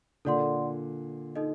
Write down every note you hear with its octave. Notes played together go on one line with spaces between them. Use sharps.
A#2 D3 A4 D5 F#5 C6
D#4 A4 D#5